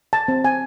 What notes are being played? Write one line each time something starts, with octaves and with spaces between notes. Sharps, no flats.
A5
C4
G#5